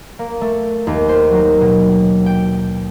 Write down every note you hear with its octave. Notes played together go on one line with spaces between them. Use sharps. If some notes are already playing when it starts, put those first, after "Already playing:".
A#3
A3
D#2
C5
F#3
B2
G5